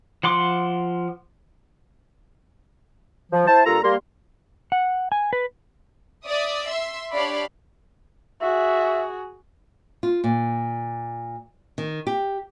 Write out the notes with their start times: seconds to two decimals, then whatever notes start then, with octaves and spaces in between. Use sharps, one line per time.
0.23 F3 F#5 C6 D6
3.31 F3
3.47 E4 C5 A5
3.65 G2 A#3 F4 A4 A#5
3.83 G3 A#3 A#4 C6
4.72 F#5
5.12 G#5
5.33 B4
6.26 D5 E5 D#6
6.67 E5 C6 E6
7.13 D4 G4 C#5 D5 F5 B5
8.42 F#4 G#4 E5
10.03 F4
10.24 A#2
11.78 D#3
12.07 G4